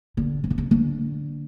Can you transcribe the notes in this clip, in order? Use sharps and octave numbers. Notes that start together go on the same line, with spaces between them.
D3
C#3
B2
C#3
D3